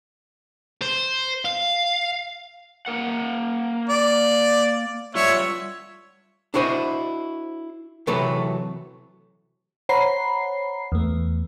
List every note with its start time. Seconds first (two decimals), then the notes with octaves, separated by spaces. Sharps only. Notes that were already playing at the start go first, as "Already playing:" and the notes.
0.82 C5
1.45 F5
2.86 A#3 A#4 F#5
3.90 D5
5.15 G3 F4 C#5 E5
6.54 D4 E4 F#4 C5 D#5
8.07 C3 E3 F#3 A3 A4 B4
9.89 C5 C#5 F#5 A#5 B5 C7
10.92 E2 A3